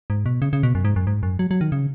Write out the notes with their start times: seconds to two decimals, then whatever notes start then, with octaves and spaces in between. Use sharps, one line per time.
0.10 G#2
0.26 B2
0.42 C#3
0.53 C#3
0.63 B2
0.75 F#2
0.85 G#2
0.96 F#2
1.07 G#2
1.23 F#2
1.39 F#3
1.51 F#3
1.61 D#3
1.72 C#3